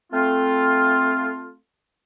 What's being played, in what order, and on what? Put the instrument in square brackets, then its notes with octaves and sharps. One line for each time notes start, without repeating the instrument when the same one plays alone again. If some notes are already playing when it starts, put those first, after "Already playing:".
[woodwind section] A3 C4 F4